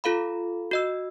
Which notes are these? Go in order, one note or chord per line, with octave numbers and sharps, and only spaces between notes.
F4 A4 F5 B5
F#4 D#5 E6